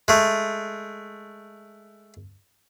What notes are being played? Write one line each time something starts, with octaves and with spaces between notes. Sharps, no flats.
G#3 A3